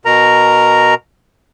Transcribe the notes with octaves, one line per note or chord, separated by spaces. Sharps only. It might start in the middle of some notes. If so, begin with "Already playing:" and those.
B2 A#4 A#5